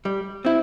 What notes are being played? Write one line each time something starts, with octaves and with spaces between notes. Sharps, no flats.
G3
C4 E4